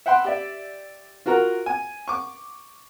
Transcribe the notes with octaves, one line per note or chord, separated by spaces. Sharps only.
E5 F#5 G5 B5 C6
G4 D5 E5
F4 F#4 A#4 A#5
G#5
C#6 D6